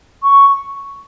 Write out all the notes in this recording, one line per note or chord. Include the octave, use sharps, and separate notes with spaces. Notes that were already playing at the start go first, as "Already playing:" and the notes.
C#6